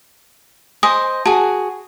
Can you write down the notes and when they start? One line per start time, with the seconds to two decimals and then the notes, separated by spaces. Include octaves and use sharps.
0.83 C5 D#5 G#5 D#6
1.26 F#4 G#4 A5